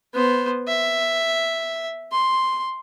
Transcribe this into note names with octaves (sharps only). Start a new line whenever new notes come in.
B3 C5
E5
C6